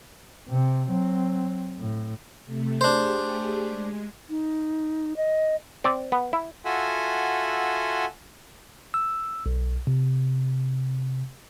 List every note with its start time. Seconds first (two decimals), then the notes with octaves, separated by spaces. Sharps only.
0.49 C3 C4
0.89 F#3 C4
1.78 A2
2.46 C3 A3
2.81 A3 D4 G4 G#4 C5
3.69 G#3
4.29 D#4
5.16 D#5
5.84 C4 D5
6.12 B3
6.33 E4
6.65 F4 F#4 A4 E5 F#5 G#5
8.94 E6
9.46 B1
9.87 C3